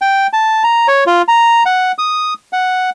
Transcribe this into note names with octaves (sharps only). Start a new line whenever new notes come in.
G5
A5
A#5
C#5
F4
A#5
F#5
D#6
F#5